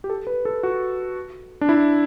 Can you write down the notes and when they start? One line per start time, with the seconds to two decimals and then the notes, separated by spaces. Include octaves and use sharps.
0.04 G4
0.10 A4
0.27 B4
0.45 A4
0.63 F#4
1.61 D4
1.69 E4